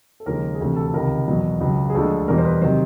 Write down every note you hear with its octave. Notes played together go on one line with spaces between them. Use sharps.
A4
D#2 C#3 F3 G#3 A#4
G#4
D2 C3 E3 A4
A4
A4
C#2 C3 D#3 A#4
E2 B2 F#3
C#2 C#3 F#3
G#4
D2 D3 F3 G#3 A4
E2 B2 G3 A#4
C5
B4
C3 D#3 F#3 C5